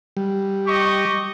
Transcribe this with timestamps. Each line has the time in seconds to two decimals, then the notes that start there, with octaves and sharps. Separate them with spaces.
0.17 G3
0.67 G4 D#5 C#6